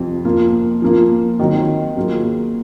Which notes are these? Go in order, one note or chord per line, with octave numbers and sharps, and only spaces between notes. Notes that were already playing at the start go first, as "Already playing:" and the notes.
Already playing: F2 C3 F3 C4 F4
F3 A#3 F4
F3 A#3 F4
D#3 F#3 C4 D#4
F#3 A#3 F4 G#4